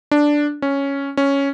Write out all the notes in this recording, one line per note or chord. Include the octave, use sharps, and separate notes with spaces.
D4
C#4
C#4